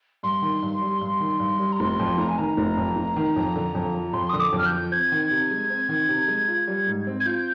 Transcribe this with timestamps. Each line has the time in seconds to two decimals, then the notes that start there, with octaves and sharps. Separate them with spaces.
0.23 G2 C6
0.42 D#3
0.63 G2
0.81 G3
1.01 G2
1.20 D#3
1.40 G2
1.59 G3
1.72 A#5
1.80 F1 C6
1.99 F2
2.18 F1 A#5
2.28 G#5
2.38 D#3 A#5
2.57 F1
2.77 F2
2.96 F1
3.16 D#3
3.36 F2
3.56 D3
3.75 F2
3.94 F3
4.13 F2 C6
4.29 D3 D#6
4.40 D6
4.52 F2
4.58 F6
4.66 G6
4.72 F3
4.92 C4 G#6
5.12 D#3
5.31 C3
5.51 G#3
5.70 C4
5.89 D#3
6.09 C3
6.28 G#3
6.48 F4
6.67 G3
6.87 G#2
7.07 C4
7.20 G#6
7.26 F4 G6